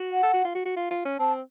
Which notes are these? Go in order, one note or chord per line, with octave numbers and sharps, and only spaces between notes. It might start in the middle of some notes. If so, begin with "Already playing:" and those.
Already playing: F#4
F#5
A4
F#4
F4
F#4
F#4
F4
F4
C#4
C4 A5